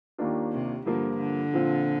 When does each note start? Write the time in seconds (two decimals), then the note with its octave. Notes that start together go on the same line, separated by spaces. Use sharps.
0.18 D#2 D#3 A#3 D4 F4
0.52 C3
0.86 G2 D3 F3 A#3 F4
1.19 D3
1.53 A#2 F3 C4 F4